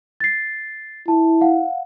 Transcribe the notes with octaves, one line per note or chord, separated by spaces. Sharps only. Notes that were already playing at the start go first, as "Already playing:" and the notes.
A6 C7
E4 A5
F5 F#5